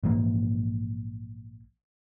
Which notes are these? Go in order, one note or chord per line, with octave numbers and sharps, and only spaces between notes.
A#1 G#2 E3 A#3